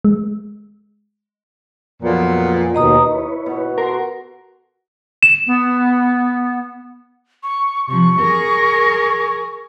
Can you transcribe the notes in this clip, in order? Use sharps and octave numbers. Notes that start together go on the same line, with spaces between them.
G#3
F2 A#2 F#3 B3
D#2 B2 D#5 A#5 D#6
E4 B4 C#5
B2
F#4 A4 A#4 C6
E7
B3
C#6
C3 F3 C#6
G#4 A#4